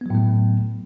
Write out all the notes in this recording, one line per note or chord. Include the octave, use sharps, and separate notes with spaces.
A2 F#3 A3 B3